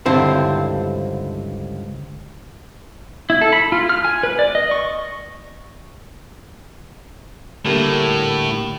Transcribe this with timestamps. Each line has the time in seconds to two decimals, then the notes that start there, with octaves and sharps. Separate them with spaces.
0.06 C#2 G2 D3 C4 E4 C5
3.30 E4
3.41 A4
3.53 B5
3.72 F4
3.89 F6
4.05 G#5
4.23 B4
4.39 D5
4.55 D#5
4.71 C#6
7.65 A2 D3 G3 A#3